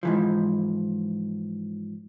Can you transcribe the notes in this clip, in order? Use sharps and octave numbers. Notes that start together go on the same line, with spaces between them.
G#2 E3 F3